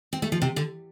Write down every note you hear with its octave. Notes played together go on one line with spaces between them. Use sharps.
C4
A3
F3
C3
D3